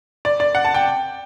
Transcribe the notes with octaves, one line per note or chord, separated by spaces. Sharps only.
D5
D5
F#5
A5
G5